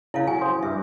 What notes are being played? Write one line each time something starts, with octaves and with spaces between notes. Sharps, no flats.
C#3 E4 A4 F5
F#3 G#5
G#4 C5
G2 E5